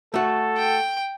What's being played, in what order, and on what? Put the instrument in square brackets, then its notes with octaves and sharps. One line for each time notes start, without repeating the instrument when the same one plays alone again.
[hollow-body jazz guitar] A3 F#4 [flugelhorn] A4
[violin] G5